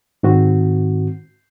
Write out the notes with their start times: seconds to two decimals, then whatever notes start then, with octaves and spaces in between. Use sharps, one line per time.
0.23 G#2 D#3 C4 F#4